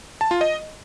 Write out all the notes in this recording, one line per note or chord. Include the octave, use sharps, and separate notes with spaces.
A5
F4
D#5